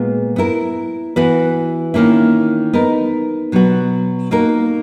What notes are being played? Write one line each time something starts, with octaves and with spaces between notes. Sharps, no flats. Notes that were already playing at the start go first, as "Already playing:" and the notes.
Already playing: A#2 G#3 B3 F#4
B3 E4 A#4
E3 B3 F#4 B4
D#3 A#3 C#4 E4
B3 D#4 A#4
B2 F#3 B3 F#4
A#3 D#4 F#4 A#4